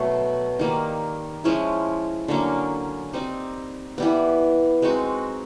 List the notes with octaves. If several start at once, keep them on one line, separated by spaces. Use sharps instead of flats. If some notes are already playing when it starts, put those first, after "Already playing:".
Already playing: B2 F#3 A3
D#3 G3 A#3
F3 G#3 C#4 E4
D3 F#3 A#3 C#4
G3 C4 D#4
E3 G3 B3
G#3 C4 D#4 F#4